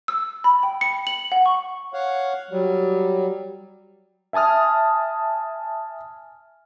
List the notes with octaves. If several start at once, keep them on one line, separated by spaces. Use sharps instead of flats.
E6
B5
G5
C#7
F#7
F#5
C#6
C#5 F5 F#5
F#3 G3
E5 G#5 A5 D#6 F6